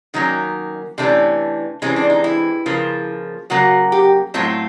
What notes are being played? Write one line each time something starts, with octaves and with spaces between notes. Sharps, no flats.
D#3 F#3 A#3 C#4 D#4
C3 E3 A3 C#4 D4
C3 E3 G#3 C4 C#4
D4
D#4
E4
C#3 F3 A#3
C#3 F#3 A#3 F#4
G4
A2 F#3 A3 C4 F4